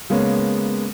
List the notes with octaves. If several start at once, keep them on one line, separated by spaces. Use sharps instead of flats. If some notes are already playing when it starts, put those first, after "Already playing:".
C#3 G#3 A#3 B3 C#4